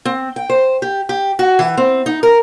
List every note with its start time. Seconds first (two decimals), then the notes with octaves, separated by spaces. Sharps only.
0.05 C4
0.36 G5
0.50 C5
0.82 G4
1.09 G4
1.39 F#4
1.59 E3
1.77 C4
2.06 D#4
2.23 A#4